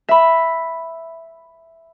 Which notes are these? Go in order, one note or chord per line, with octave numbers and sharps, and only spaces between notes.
E5 B5